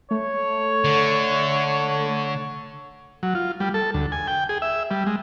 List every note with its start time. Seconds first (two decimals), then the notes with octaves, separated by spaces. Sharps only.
0.11 A3 C#5
0.84 D3
3.23 F#3
3.35 F4
3.60 G3
3.74 A4
3.94 D2
4.12 G#5
4.28 G5
4.49 G#4
4.62 E5
4.91 G3
5.07 G#3